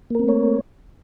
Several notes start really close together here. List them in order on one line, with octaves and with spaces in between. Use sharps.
A#3 A#4 C4 A3 C#5